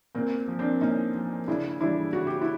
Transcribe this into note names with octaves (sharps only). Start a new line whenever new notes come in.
A#2 A#3 C4
F3
C4 D4
A#2 C#4 D#4
F3
C#3 D4 E4
E3 G3 D4 E4
C#3 F#4
G4
E4 F#4